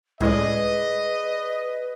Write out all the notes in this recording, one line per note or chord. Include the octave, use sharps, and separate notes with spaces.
C#2 A2 G#3 G#4 B4 D5 D#5